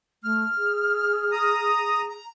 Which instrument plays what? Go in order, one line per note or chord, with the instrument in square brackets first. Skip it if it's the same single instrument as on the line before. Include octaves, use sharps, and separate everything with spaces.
[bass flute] A3 [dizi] F6
[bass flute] G#4
[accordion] A#5 D#6
[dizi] A#5